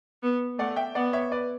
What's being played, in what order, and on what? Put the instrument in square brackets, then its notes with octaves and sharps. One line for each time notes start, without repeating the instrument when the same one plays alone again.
[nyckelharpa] B3
[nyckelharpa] A3 [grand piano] D5 F#5
[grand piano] E5 G5
[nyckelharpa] B3 [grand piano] D5 F#5
[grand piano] C#5 E5
B4 D5